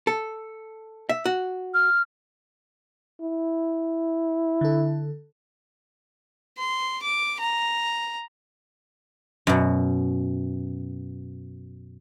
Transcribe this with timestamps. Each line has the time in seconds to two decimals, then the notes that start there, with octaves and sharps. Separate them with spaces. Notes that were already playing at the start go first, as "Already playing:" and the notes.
0.07 A4
1.09 E5
1.25 F#4
1.74 F6
3.21 E4
4.61 D3 A4
6.58 C6
7.03 D6
7.40 A#5
9.47 F#2 B2